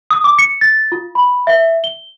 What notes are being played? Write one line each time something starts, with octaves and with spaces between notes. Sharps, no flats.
D#6
D6
C#7
A6
F4
B5
E5
G7